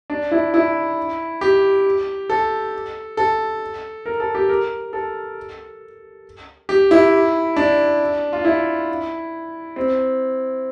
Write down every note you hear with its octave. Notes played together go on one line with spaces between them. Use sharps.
D4
E4
E4
G4
A4
A4
A#4
A4
G4
A#4
A4
G4
E4
D4
F4
E4
C4